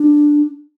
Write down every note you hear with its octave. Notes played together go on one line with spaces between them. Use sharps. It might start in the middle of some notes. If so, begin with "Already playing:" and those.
Already playing: D4